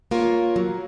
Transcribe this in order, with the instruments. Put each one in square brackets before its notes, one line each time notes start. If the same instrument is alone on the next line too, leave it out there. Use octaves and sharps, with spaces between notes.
[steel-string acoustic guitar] A#3 F4 A#4 C#5
F#3